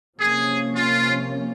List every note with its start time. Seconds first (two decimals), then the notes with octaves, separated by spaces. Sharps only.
0.19 C3 F3 A#3 C#4 G#4
0.75 F4